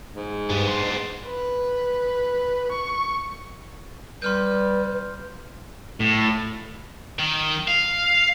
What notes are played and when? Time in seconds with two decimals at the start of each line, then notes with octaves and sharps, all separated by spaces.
0.15 G#2
0.50 G2 B3 D4
0.68 C6
1.26 B4
2.71 C#6
4.22 G3 B4 C6 F6 G6
6.00 A2
7.19 D#3
7.68 F5